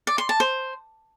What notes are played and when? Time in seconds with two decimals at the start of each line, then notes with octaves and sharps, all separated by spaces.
0.07 D5
0.18 C6
0.29 A5
0.40 C5